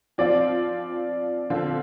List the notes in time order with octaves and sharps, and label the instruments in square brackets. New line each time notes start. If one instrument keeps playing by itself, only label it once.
[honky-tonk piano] F3 C4 F4 [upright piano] D5
[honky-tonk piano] D3 F3 C4 F4 A4